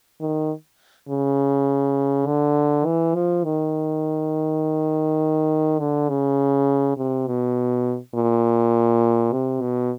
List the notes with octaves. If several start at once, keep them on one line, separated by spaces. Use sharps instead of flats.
D#3
C#3
D3
E3
F3
D#3
D3
C#3
C3
B2
A#2
C3
B2